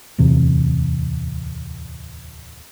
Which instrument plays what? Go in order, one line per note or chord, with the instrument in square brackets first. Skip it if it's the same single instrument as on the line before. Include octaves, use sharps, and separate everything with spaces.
[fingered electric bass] D1 E2 C3